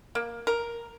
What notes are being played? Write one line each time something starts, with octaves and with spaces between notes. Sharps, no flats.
A#3
A#4